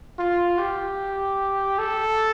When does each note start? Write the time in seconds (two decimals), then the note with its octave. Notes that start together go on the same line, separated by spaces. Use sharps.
0.19 F4
0.58 G4
1.79 A4